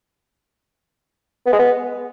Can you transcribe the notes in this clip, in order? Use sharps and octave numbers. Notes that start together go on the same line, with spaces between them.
B3
G#3
B3